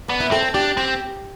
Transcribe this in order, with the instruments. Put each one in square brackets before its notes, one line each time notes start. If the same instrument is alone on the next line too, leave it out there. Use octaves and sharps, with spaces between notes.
[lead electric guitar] B3 [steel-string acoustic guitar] D4
[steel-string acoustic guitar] E4
[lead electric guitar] C4 [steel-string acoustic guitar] A4
[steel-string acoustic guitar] A4
[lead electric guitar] D4 [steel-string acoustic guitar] G4
[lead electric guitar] C4 [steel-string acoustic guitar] G4